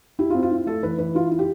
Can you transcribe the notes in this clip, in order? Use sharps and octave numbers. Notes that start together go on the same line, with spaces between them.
E4 G4
F4
C4
F4
E4
A3 A4
E3 B4
E3 B4
E4 F4
E4
G4